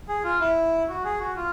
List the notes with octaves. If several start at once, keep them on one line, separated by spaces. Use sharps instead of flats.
G#4
F4
E4
F#4
G#4
F#4
F4